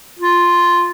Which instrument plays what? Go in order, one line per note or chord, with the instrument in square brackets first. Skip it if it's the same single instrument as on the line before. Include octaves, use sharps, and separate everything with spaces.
[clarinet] F4